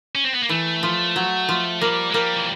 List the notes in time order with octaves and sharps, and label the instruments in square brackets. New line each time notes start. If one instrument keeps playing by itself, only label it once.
[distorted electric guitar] C#4
C4
B3
A#3
[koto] E3 [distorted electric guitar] A3
[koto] F3
F#3
F3
[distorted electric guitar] G3 [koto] A#3
[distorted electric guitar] G#3
[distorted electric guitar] G3 [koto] A#3
[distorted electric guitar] E3